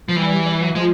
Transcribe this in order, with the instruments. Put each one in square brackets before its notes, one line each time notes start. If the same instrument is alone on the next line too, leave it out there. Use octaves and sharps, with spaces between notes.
[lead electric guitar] F3
[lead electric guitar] E3 [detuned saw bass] G3
[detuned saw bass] G3
F#3
[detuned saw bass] F3 [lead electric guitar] G#3